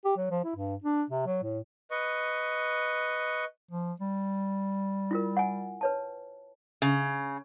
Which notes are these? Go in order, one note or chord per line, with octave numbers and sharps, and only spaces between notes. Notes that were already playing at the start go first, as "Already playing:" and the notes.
G4
F#3
F3
E4
G2
D4
C3
F#3
A2
B4 D#5 C#6
F3
G3
E4 F4 A#4
F#5 G#5
B4 C#5 A5
C#3